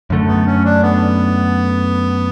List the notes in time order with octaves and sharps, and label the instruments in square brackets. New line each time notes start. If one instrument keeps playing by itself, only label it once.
[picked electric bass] F#2 D3 A3
[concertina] B3
C#4
D4
B3